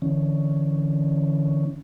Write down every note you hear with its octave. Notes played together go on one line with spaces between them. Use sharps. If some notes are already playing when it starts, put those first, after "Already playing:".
D3 E3 C#4